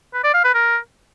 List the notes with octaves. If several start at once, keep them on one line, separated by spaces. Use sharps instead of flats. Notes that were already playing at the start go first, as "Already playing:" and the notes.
B4
D5
F5
B4
A#4